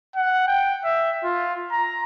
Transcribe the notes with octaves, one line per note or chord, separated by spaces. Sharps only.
F#5
G5
E5
F4
A#5